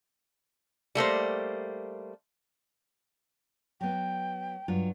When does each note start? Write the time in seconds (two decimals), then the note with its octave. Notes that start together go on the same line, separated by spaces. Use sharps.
0.95 G3 A3 A#3 C5
3.81 F#3 B3 G5
4.68 G2 F#3 F4